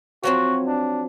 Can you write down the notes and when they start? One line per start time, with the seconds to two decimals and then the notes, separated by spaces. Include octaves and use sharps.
0.23 F3 F#3 C4 F#4
0.67 D4